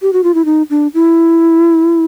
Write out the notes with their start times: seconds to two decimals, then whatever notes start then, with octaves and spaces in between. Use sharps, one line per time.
0.02 G4
0.13 F#4
0.24 F4
0.34 E4
0.45 D#4
0.70 D4
0.94 E4